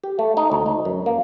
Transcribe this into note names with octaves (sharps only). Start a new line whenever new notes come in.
G4
A3
D#4
D2
D#4
F#2
A#3